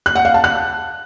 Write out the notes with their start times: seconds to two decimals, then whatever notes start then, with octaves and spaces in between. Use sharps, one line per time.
0.06 F#6
0.15 F#5
0.25 F5
0.34 A5
0.44 F#6